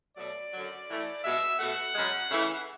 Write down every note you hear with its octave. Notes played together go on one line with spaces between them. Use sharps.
B2 F#3 A3 D5
F#2 D3 F#3
A2 E3 A3
B2 G#3 E5
B2 A3 F#5
F#2 C#3 G#3
C#3 E3 A3